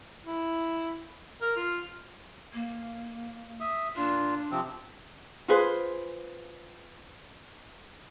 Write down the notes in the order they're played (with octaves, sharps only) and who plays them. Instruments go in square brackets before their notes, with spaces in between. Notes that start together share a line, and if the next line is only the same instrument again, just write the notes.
[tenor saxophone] E4
A#4
F4
[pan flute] A#3
[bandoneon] E5 D#6
[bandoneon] A#2 F4 [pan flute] D4
[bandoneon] C3 F3 C4
[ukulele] F4 G#4 B4 C5